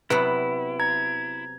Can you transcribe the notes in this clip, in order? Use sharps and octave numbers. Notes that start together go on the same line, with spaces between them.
C3 F#3 B3 E4 B4
A#5 G#6